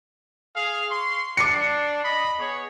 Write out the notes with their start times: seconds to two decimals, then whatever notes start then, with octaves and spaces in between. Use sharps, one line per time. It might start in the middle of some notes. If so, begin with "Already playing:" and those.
0.56 G#4 F5
0.91 C6 C#6
1.37 D4 D6 C7 C#7
2.04 D#5 B5
2.38 B3 G#4 C#5